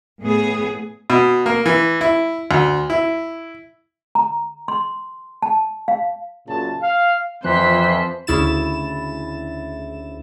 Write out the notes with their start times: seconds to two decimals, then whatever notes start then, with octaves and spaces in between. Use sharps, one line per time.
0.22 A2 B3 G#4
1.10 B2
1.46 A#3
1.66 E3
2.01 E4
2.51 D2
2.90 E4
4.15 A#5
4.68 C6
5.42 A5
5.88 F5
6.47 F#2 A#2 C#3 A5
6.82 F5
7.44 F2 E3 F3 C5 F#6 B6
8.27 D2 C#3 E4 A6 E7